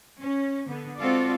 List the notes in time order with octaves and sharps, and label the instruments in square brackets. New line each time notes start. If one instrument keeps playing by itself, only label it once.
[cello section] C#4
D3 B3
G#3 C4 F4 F#4 A4 D5